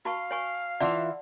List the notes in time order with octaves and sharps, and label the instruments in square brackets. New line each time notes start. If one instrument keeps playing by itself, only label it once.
[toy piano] F#4 A5 C#6 [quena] F5
[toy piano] C#5 G#5 C#6
[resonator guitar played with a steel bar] E3 F4 E5 [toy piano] D5 F#5 A5